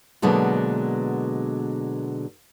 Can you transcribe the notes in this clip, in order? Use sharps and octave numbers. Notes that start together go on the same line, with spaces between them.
B2 D3 F#3 G#3 A#3